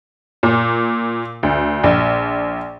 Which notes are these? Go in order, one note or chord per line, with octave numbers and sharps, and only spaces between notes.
A#2
D2
A#1